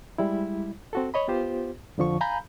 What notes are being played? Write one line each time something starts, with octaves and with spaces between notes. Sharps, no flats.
G3 G#3 E4
C4 F#4 A4
C#5 D#5 B5
B3 F4 G4 C5
F2 D3 F3 C#6
F5 G#5 A#5 B5 G6